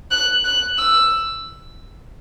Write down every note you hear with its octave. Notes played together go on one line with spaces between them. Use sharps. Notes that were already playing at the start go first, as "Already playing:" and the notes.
F#6
F#6
E6